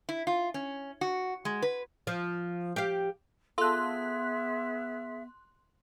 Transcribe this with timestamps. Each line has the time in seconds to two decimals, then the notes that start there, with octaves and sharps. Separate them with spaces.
0.09 E4
0.27 F4
0.54 C#4
1.01 F#4
1.45 G#3
1.62 B4
2.07 F3
2.76 G4 F5
3.58 B3 F4 G#4 A4 E5 C6 F#6